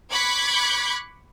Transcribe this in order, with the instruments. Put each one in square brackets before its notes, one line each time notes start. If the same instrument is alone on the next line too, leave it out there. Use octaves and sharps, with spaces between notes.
[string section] B5 C#6 D6 F#6 G#6 B6